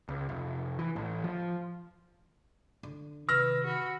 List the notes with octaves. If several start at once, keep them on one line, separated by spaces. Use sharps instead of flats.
C#2
F1
E3
A1
F3
D3
C3 D#3 B4 E6 F6 A#6
F#4 B5